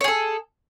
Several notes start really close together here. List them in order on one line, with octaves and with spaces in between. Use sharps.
C#5 G#4 A4